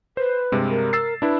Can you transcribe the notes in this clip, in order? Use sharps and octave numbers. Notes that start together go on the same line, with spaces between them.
B4 C5
G2 C3 G#3
A#4
E6 A6 C7
D4 E4 B4